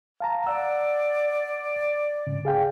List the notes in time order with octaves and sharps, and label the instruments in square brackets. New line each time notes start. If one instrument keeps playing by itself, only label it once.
[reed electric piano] F5 A5 A#5
[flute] D5 [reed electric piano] F#5 E6
[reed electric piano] G#2 C#3
G#4 F5 G5